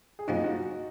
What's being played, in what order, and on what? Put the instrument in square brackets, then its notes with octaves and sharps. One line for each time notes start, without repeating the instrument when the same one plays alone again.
[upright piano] G#4
[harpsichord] F#2 F3 A#3 [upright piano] D#4 F#4
[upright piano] D#4 F#4